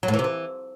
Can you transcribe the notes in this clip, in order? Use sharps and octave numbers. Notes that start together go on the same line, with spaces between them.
F#3
A2
E3
C3
E3